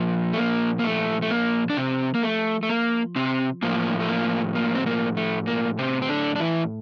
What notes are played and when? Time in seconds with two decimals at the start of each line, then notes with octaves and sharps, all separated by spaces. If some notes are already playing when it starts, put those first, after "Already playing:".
Already playing: A#2 F3
0.33 A3
0.38 A#3
0.79 A#3
0.84 A3
1.22 A3
1.31 A#3
1.70 D4
1.77 C3 C4
2.14 A#3
2.23 A3
2.63 A3
2.69 A#3
3.16 C3 C4
3.62 A2 F3 A#3
4.00 A3
4.09 A#3
4.55 A#3
4.75 C4
4.86 A#3
5.17 A3
5.47 A#3
5.79 C3 C4
6.02 C4
6.09 D3 D4
6.36 D4
6.40 E3 E4